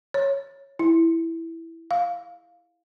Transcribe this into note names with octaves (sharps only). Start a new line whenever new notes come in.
C#5
E4
F5